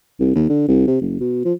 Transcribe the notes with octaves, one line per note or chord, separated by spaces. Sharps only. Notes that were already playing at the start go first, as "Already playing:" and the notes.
C2
D#2
D3
C2
C3
F#1
B2
F3